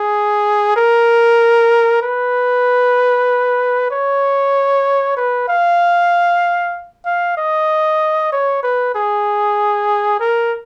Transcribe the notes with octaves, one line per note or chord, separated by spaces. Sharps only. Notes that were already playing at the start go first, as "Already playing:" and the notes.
Already playing: G#4
A#4
B4
C#5
B4
F5
F5
D#5
C#5
B4
G#4
A#4